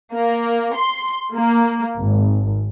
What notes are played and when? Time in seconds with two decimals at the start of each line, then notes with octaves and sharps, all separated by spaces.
0.13 A#3
0.75 C6
1.35 A#3
1.97 G#1